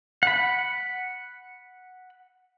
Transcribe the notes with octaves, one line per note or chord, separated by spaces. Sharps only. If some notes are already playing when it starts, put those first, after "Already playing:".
F#5 B5